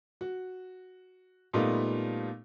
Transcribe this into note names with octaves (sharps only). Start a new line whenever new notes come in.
F#4
A#2 G3 A3 B3 D#4 F4